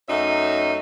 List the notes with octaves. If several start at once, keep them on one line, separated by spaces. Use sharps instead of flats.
F#2 A3 D#4 C#5 E5